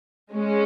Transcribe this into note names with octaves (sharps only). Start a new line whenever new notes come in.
G#3 C#4